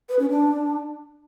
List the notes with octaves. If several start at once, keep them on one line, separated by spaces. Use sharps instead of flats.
B4
C#4
D4